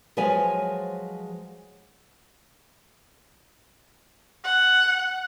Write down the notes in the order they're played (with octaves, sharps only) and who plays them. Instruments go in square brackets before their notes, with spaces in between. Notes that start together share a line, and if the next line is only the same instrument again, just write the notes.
[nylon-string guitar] F3 F#3 G#3 B4 C#5 G#5
[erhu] F#5